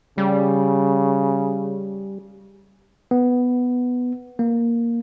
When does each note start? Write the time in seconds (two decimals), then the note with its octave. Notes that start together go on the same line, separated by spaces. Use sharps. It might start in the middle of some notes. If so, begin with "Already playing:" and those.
0.18 C#3 G3
3.11 B3
4.39 A#3